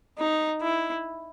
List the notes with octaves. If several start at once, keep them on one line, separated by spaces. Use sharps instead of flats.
D#4
E4